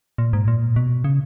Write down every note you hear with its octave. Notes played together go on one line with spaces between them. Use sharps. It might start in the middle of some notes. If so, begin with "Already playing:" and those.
A#2
G#2
A#2
B2
C#3